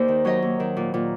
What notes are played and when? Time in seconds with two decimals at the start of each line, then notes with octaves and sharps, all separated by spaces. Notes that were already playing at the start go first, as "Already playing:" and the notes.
Already playing: D#2 C5 D5
0.08 D#3
0.25 F#3 C#5 D#5
0.42 D#2
0.60 D#3
0.77 A#2
0.94 A#2